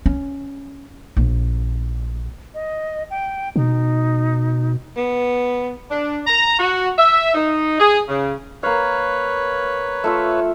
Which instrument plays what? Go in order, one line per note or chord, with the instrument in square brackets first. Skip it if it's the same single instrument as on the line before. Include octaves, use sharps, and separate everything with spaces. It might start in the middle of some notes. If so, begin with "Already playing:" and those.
[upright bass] C#4
A#1
[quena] D#5
G5
[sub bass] B2 [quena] D#4
[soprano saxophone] B3
[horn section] D4
A#5
F#4
E5
D#4
G#4
C#3
[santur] A#3 F5 [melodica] B4 C#5
[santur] A3 F4 E5